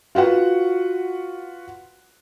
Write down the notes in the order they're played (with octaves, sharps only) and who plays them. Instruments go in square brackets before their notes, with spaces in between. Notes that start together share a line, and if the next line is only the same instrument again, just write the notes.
[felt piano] F4 F#4 B4 F#5